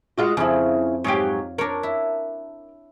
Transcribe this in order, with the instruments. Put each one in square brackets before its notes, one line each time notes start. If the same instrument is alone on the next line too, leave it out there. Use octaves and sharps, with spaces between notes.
[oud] G#3 F4 F#4
[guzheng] F2 F3 [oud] C#3 E4
[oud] G#2 F#3 G4 [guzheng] C#5 F5
[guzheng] D4 C#5 [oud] A#4
[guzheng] E4